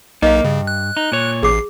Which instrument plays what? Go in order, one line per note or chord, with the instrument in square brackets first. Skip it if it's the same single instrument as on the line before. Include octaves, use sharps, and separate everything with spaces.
[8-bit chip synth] B1 D#4 [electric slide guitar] A#3 [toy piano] D#5 F5
[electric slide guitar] G2 [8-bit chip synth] C#3
[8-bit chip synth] F#6
[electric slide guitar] D#4
A#2 C#5
[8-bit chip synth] A1 C7 [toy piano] G#4 D6